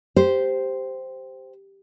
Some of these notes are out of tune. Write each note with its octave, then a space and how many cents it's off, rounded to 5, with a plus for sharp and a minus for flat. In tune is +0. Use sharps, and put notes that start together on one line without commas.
G4 +0 C5 -5